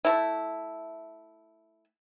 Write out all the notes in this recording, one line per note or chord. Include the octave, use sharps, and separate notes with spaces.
A3 E4